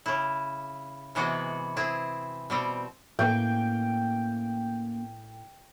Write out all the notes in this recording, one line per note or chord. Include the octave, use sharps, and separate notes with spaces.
C#3 E4
C3 E3 G#3 B3 F#4
C4 E4 G#4
B2 G3 C4
A2 A#3 C#4 G5